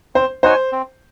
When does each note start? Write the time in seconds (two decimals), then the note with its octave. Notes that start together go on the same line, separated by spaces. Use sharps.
0.15 C4 C5
0.43 D#4 F#4 C5 C#5 G#5
0.72 C4